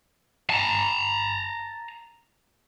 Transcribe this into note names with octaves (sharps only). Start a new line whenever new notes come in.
A5 A#5